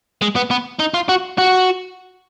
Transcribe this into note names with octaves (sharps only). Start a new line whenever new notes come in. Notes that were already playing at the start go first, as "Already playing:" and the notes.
G#3
B3
B3
D#4
F4
F#4
F#4